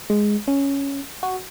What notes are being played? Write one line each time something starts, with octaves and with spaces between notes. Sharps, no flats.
G#3
C#4
F#4